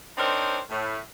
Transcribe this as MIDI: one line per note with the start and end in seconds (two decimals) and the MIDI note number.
0.17 0.58 60
0.17 0.58 62
0.17 0.58 63
0.17 0.58 70
0.17 0.58 72
0.17 0.58 73
0.69 0.98 45